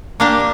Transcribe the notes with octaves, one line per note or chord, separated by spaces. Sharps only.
A#3 D4 G4